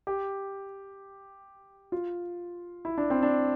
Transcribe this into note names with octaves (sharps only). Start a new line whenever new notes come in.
G4
F4
E4
D4
C4
D4